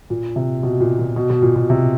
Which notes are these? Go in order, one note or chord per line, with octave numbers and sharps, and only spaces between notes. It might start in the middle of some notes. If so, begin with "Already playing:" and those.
A#2
C3
B2
A#2
A#2
B2
B2
A#2
B2
C3